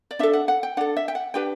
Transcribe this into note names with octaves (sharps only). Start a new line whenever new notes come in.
D5
D4 A4 E5
F#5
F#5
G5
D4 A4 F#5
E5
G5
F#5
D4 G4 B4 G5